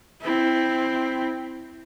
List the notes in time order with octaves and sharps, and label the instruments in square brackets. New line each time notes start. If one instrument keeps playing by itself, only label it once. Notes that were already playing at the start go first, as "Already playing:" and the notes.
[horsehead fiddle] C4 E4